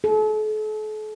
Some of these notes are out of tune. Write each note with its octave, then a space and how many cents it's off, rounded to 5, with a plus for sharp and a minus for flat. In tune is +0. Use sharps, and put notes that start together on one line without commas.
A4 -40